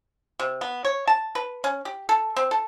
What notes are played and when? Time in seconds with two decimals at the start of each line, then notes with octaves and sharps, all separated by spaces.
0.40 C3
0.61 B3
0.85 C#5
1.07 A5
1.35 B4
1.64 C#4
1.85 G4
2.09 A4
2.36 C4
2.51 A4